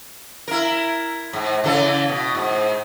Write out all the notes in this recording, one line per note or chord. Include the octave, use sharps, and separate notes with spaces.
E4 A#4
G#2
C#3 E3 A4
B2
G#2